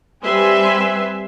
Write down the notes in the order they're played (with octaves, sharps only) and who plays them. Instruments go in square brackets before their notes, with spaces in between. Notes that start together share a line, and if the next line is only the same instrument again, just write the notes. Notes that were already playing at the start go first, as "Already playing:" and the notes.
[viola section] G3 C4 B4 E5 G#5 C6